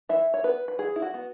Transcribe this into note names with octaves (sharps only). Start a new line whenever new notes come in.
E3 E5
C#5
B3 B4
B4
E3 G#4
E4
F#4
B3